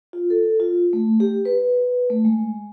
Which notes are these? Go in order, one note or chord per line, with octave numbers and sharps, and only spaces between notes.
F4
A4
F4
A3
G4
B4
A3
G#3